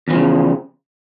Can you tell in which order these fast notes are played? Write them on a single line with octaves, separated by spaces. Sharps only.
E2 E3 F3 C#3